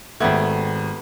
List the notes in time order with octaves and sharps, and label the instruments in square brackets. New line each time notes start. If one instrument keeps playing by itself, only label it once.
[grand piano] G#1 G#6 [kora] A3 B3 G4